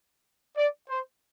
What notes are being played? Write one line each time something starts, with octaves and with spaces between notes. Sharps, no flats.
D5
C5